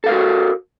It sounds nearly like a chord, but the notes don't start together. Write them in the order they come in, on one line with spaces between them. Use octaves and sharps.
A4 F5 A#4 F#4